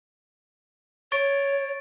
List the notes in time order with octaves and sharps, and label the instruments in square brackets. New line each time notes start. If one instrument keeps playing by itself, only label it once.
[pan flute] C#5 [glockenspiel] C#6 A6 D7